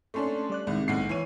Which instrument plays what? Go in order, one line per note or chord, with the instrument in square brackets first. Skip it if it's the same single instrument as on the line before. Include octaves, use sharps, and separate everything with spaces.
[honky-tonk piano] A3 C#4 D4 [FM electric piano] A5 C6 C#6
[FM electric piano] G3 D5 F#6
[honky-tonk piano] C2 [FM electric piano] D#3 G#3
[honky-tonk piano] B1 F#5 C7
E3 C#5 D#7